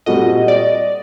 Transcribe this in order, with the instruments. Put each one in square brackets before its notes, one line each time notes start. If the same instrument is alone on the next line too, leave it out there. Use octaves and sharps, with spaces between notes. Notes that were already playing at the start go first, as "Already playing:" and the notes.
[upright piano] A#2 G3 C4 F#4 A4 [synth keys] D#5
[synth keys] D5